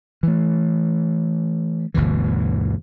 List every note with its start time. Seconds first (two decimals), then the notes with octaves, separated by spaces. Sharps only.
0.23 E3 A3
1.94 G1 D2 B2 E3